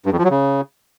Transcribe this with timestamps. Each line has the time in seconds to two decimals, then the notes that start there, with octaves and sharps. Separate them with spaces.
0.06 G2
0.12 F2
0.18 F3
0.24 F#3
0.30 C#3